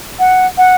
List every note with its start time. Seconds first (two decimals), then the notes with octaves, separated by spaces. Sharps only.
0.19 F#5
0.58 F#5